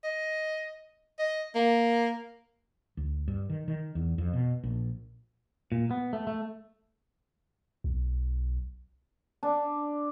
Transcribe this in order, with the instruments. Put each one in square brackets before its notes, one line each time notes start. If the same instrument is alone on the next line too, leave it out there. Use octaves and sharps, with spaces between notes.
[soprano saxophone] D#5
D#5
A#3
[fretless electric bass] D2
G2
D#3
D#3
E2
F2
B2
A#1
[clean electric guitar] A#2
B3
A3
A3
[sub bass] B1
[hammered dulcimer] D4